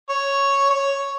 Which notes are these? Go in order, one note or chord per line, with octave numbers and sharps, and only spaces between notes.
C#5
C#5